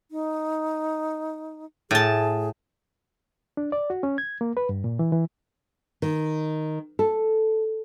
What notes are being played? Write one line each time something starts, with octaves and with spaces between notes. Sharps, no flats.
D#4
A2 G#4 A5
D4
D5
F#4
C#4
G#6
A#3
B4
G2
A#2
E3
E3
D#3
A4